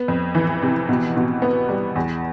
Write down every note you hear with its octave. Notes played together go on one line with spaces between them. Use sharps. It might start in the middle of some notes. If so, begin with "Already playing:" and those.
Already playing: B3
F2
E3
C3
B2
B2
B3
G3
E2